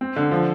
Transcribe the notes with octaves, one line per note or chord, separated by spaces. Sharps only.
C4
D3
F3